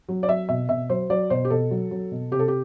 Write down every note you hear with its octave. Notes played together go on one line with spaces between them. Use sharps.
F#3
D5
F#3 E5
B2 E5
B2 E5
F#3 C5
F#3 D5
B2 C5
G4
B2 A4
F#3
F#3
B2
C3 G4
A4
G4